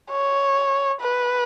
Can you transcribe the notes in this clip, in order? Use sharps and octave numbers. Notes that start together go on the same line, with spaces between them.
C#5
B4